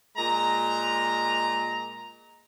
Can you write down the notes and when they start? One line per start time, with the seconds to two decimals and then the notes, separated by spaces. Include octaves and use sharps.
0.16 A#2 G#3 A#5